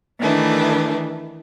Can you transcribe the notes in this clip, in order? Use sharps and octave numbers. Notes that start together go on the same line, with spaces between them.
D#3 E3 A3 D4 B4